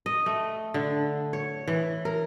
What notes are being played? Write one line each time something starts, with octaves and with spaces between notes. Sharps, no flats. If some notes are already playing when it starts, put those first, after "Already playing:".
D#5
A3
D3
C#5
E3
A#4